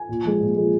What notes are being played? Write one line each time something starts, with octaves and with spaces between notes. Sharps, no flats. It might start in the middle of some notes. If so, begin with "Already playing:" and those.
Already playing: G#5
A#2
F3 G#3
A#2
F3 G#3